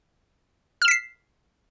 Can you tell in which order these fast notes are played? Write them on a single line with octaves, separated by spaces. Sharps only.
F6 E7 B6 C7